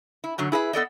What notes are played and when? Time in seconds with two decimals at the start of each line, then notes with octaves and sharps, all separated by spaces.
0.24 E4
0.38 F#2 D3 F#3
0.52 E4 G#4 B4 E5
0.73 B3 A4 D5 D#5